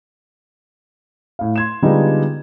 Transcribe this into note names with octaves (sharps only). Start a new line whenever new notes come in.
A2 F5
C6 G#6 E7
D3 G3 G#3 B3 D#4 F4